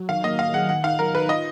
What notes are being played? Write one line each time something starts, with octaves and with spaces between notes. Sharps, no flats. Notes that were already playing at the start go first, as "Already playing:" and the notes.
Already playing: F#3
D#3 F5
A#3 D#5
D#3 F5
G#4 F#5
D#3 F#5
D#4 F5
F#3 A#4
D#3 B4
F4 D#5